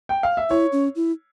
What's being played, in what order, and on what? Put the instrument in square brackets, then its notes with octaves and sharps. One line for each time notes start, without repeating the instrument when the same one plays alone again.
[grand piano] G5
F5
E5
[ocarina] E4 [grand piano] C#5
[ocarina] C#4
E4